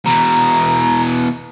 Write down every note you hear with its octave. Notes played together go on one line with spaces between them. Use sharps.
B2 E3 A#5